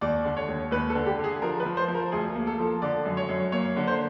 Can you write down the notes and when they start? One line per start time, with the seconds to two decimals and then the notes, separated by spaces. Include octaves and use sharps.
0.01 D#2 D5
0.25 D3
0.37 C#5
0.48 D#2
0.71 D#2 B4
0.90 A4
0.95 D3
1.06 G4
1.19 D3 G#4
1.42 F3 A#4
1.60 B4
1.66 F3
1.77 C5
1.88 F3
1.94 A#4
2.12 D2 G#4
2.35 A#3
2.47 A4
2.59 F3
2.82 D3 D5
3.06 F#2
3.17 C#5
3.29 F#2
3.52 A#3 C#5
3.76 D3
3.87 C5